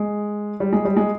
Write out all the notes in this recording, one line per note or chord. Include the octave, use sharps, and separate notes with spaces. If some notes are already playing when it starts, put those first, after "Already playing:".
Already playing: G#3
G3
G#3
G3
G#3